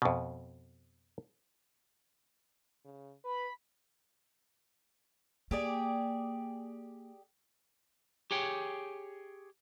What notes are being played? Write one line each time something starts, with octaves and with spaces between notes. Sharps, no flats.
F2 B2
C#3
B4 B5
A#3 G4 G#4 D5
G4 G#4 C#5 G5